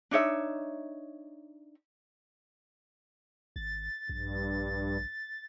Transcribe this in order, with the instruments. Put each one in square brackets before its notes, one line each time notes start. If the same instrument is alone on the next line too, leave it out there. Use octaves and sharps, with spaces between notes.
[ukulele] D4 D#4 C#5 E5
[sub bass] G#1 [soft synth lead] A6
[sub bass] A#1 [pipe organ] G2